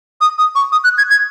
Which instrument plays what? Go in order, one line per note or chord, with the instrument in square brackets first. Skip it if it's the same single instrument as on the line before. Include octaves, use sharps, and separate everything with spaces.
[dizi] D#6
D#6
C#6
D#6
F#6
G#6
G#6